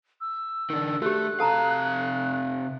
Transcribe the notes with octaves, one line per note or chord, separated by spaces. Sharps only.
E6
D#3 D4
A3 F#4 G4 F#6
C3 A4 F5 A5 A#5